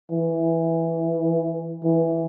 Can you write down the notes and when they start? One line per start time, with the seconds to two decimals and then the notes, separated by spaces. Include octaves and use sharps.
0.11 E3
1.83 E3